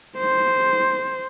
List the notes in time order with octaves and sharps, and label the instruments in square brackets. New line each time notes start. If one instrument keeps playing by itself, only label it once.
[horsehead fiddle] C5